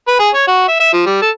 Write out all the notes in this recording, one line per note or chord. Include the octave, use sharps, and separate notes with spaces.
B4
G#4
C#5
F#4
E5
E5
F3
G3
A4